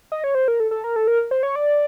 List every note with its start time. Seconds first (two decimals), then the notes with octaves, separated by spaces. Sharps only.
0.12 D#5
0.24 C#5
0.35 C5
0.48 A#4
0.60 A4
0.71 A4
0.84 A#4
0.96 A4
1.07 A#4
1.31 C5
1.43 C#5
1.56 D5